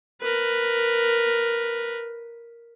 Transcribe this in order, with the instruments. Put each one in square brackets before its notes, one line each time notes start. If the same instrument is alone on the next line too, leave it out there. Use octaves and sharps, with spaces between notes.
[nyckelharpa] A#4 B4